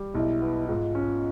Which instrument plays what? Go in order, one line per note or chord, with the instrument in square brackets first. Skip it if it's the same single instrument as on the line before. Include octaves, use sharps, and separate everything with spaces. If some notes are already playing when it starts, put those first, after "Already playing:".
Already playing: [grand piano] G3
[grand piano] B1 [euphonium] E4
[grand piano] B3
[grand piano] G#2 [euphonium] F4
[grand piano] C#4